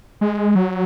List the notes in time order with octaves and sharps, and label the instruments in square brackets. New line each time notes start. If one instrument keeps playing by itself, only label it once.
[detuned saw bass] G#3
F#3